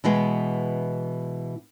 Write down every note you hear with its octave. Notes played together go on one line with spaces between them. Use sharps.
B2 E3 G#3 B3